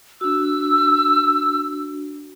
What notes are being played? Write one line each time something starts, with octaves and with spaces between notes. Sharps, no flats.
D4 F#4 E6